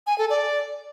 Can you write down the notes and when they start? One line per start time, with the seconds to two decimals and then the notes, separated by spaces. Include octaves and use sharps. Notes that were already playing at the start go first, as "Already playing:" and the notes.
0.07 G#5
0.18 A4
0.30 D5